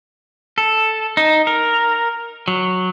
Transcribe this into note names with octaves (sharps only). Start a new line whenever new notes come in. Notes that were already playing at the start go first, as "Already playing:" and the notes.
A4
D#4
A#4
F#3